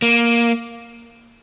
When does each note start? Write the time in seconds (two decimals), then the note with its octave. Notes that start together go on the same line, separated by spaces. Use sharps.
0.02 A#3